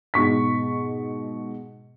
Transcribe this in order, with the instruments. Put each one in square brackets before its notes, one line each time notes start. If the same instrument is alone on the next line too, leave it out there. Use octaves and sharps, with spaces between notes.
[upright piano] G#2 B2 C#6 B6